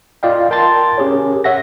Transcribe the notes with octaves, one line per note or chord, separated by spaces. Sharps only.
F4 D5 D#5 F5 G5
A#4 G5 A5 C6 A6
C#4 G4 G#4 A#4 C#5
C#5 E5 F#5 A#6